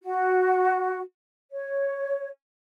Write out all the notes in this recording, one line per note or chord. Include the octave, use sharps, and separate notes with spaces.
F#4
C#5